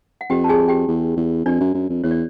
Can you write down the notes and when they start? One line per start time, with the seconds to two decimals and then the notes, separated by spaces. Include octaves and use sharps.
0.21 F#5
0.30 F2 G4 G5
0.44 A5
0.49 G#4 G#5
0.68 G4 G5
0.88 E2
1.17 E2
1.45 F2 D4 D5
1.60 F#2
1.74 F#2
1.89 F2
2.03 E2 C#5
2.11 D5